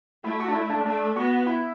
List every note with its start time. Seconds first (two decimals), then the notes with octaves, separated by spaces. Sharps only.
0.24 A3 E4
0.39 F#4
0.48 D4
0.55 E4
0.70 D4
0.85 A3 D4
1.16 B3 F#4
1.46 E4